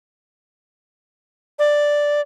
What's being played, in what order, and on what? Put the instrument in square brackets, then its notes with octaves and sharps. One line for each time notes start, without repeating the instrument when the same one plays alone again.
[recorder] D5